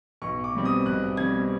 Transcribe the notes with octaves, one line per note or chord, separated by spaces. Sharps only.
B1 C#6
D6
B2 G3 C4
D#6
B1 F#6
B2 G3 C4 G#6